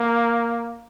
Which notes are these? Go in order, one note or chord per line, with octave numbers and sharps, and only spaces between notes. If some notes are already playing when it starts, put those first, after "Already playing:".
Already playing: A#3